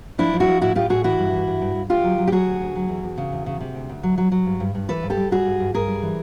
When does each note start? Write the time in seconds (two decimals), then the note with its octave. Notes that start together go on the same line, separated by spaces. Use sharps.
0.18 F3 D4 E4
0.33 F3
0.40 E4 F#4
0.47 F3
0.61 A2 E4 F#4
0.75 A2 F4 G4
0.90 A2 F#4 G#4
1.04 E3 E4 F#4
1.18 G2
1.33 E3
1.47 G2
1.61 G2
1.75 G2
1.89 D2 F4 G4
2.04 F#3
2.18 F#3
2.27 G4
2.32 F#3 F#4 G#4
2.47 D2
2.61 D2
2.75 F#3
2.89 E2
3.03 E2
3.18 C#3
3.32 E2
3.46 C#3
3.60 C3
3.75 D2
3.89 D2
4.03 F#3
4.18 F#3
4.32 F#3
4.46 G2
4.60 G2
4.75 G2
4.89 E3 A4 B4
5.03 G2
5.10 G4 A4
5.17 G3
5.31 G3 F#4 G#4
5.46 G2
5.60 G2
5.74 G2 G#4 A#4
5.88 G3
6.03 E3